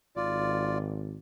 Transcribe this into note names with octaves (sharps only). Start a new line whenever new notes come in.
G#1 F4 D5